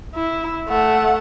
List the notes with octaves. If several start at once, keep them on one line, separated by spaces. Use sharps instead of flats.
E4
A3 F#5